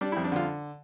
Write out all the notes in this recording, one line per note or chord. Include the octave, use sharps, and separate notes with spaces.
G3 D4
E4
F2
D4
D3 F4